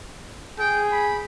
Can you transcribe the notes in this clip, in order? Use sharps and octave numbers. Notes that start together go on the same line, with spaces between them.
G#4 G5
B5